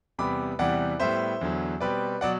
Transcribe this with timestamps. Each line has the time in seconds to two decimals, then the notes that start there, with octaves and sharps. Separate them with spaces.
0.18 E2 C3 G3 B3 B5 D6
0.59 E2 C3 E3 G3 D5 F#5
1.00 A2 G3 B3 C5 E5
1.41 E2 D3 F#3
1.80 B2 G3 C4 B4 D5
2.21 B2 F#3 D5 F#5